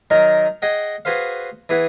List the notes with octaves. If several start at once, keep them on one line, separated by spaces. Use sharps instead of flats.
D#3 F#3 D#4 A#4
G#4 D#5 F#5 G5
F#4 G#4 B4 C5 F5
E3 G#4 B4 F#5